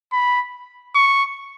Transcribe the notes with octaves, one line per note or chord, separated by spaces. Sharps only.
B5
C#6